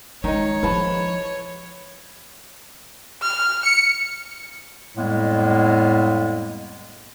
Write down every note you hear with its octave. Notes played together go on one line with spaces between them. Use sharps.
D#3 G#3 D#4 C#5
F3 E4 B4 A5 C6
F6
C#7
F2 A2 G3 G#3 A#3 B3